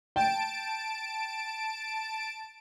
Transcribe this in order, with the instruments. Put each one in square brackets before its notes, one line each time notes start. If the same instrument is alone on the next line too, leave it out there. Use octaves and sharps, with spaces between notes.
[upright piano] G5 [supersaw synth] A5 D7